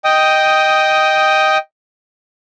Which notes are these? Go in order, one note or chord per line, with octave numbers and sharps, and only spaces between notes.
D#5 G5 D#6